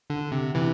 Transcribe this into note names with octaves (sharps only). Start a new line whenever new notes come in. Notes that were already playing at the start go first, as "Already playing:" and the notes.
D3
C3
C3 E3